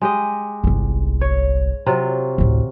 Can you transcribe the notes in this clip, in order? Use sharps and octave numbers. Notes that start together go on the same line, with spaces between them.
G#3 G4 D#5
G1 C2
C#5
C3 F#3 F4
A1 D2